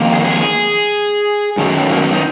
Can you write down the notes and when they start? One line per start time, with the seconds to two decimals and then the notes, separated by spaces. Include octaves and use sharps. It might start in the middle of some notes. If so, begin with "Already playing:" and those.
Already playing: F2 D#3 A#3
0.13 G#4
0.20 F#4
0.25 G#4
1.58 F#2 D#3 F#3
1.91 A#3
2.02 B3
2.13 D#4